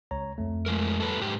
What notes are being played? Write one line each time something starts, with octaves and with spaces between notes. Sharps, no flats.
C#2 C#5 A#5
F2 A3
F3 G#3 A#4
G2 A4 B4
G#2 G4